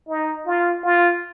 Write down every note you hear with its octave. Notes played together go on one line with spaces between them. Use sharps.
D#4
F4
F4